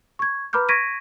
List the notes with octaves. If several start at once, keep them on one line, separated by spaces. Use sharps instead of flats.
C#6 G#6
B4 A#5 B5 D6 F6 G6
C#6 G#6 A#6 B6 D7 D#7